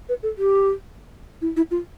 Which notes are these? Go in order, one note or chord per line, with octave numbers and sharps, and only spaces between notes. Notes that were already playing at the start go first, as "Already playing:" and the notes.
B4
A4
G4
E4
E4
F4